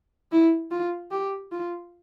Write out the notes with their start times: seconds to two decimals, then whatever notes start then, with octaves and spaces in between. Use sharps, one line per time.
0.32 E4
0.71 F4
1.11 G4
1.52 F4